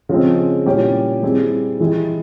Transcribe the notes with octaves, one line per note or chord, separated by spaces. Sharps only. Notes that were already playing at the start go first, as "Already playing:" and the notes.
C#3 F3 G#3 C4
A#2 G3 C#4 E4 G4
G3 C4 E4 G#4
E3 G#3 E4 G4